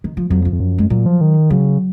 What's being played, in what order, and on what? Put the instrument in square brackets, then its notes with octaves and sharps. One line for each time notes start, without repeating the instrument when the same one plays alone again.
[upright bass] D#3
F3
[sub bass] F2 [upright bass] F#3
[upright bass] F3
[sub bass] F2
F#2
[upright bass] G#3
[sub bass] A#2 [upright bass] F#3
[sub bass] F3
D#3
[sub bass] C#3 [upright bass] F#3